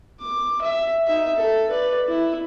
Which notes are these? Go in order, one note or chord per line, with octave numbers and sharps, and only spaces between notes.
D6
E5
D#4 E5
A4
B4 D5
E4